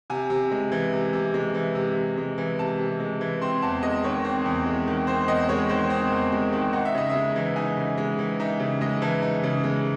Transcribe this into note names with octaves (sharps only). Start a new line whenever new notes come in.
C3 G#5
C3
G#3
E3
C3
C3
G#3
E3
C3
C3
G#3
E3
C3 A5
C3
G#3
E3
C4 C6
E2 A5
G#3 D#5
D#3 C#5
C4
E2
G#3
D#3
C4 C5
E2 D#5
G#3 C#5
D#3 C5
C4
E2
G#3
D#3
D#4 F#5
E5
C#3 D#5
E5
G#3
E3
D#4 G#5
C#3
G#3
E3
D#4 E5
C#3
G#3 D#5
E3 A5
D#4
C#3
G#3